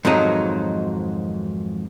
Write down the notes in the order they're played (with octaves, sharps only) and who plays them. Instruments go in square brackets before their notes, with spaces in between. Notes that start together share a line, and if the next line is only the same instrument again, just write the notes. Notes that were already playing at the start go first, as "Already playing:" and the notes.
[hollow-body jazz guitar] F2 G#2 D#3 F#3 D#4